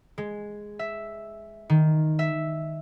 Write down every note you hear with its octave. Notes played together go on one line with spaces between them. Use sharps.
G#3
E5
D#3
E5